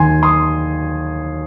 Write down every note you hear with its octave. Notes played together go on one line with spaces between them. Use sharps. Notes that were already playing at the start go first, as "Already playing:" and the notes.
Already playing: D#2 D#3 G#5 C6
C6 D#6